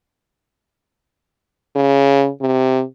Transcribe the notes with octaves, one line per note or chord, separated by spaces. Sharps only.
C#3
C3